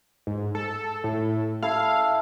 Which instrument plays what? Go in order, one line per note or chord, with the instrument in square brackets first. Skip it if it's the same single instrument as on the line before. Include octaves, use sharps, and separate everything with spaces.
[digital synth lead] G#2
A4
A2
[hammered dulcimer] E4 A4 [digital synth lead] F5